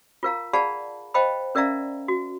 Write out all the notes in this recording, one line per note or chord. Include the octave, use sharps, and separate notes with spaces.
F4 A#4 F5 A#5
G#4 D5 F5 F#5 A5 B5
C5 D#5 F5 G5 A5 B5
C#4 A#4 D5 E5 F5 A#5
F#4